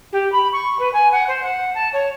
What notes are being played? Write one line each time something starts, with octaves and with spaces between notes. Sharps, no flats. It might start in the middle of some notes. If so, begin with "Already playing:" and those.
G4
B5
C#6
B4
G#5
F#5
C5
F#5
A5
C#5